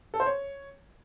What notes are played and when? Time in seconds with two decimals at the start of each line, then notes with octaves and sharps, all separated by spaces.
0.14 A4
0.20 C5
0.26 C#5